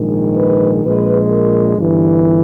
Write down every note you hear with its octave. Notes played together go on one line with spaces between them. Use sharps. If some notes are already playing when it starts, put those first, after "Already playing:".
Already playing: A#1 G#2 D#3 G#3
B4
A#1 A#2 G#3 B4
A#4
G1 G2 E3